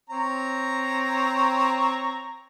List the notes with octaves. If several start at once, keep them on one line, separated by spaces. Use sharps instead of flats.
C4 C#5 A#5